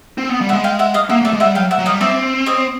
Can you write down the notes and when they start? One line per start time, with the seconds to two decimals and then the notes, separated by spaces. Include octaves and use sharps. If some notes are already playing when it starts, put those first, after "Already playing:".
0.18 C4
0.29 B3
0.41 G3
0.49 E5 F#5
0.53 G#3
0.64 F5 G5
0.79 E5 F#5
0.94 D#5 F5
1.09 A#3 E5 F#5
1.21 A3
1.25 D5 E5
1.33 G#3
1.40 E5 F#5
1.45 G3
1.55 F#3 F5 G5
1.71 E5 F#5
1.79 F#3
1.86 D#5 F5
1.89 G3
2.00 C4 D5 E5
2.46 C#5 D#5